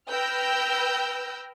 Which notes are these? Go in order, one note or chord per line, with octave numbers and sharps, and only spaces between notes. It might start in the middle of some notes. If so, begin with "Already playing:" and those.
B4 G5 E6 F6 G6 A#6